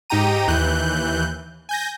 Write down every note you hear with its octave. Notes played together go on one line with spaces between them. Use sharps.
G#2 D#4 G4 G5 A#5 D#7
D#2 E3 F#6 G6
G#5 G6 A#6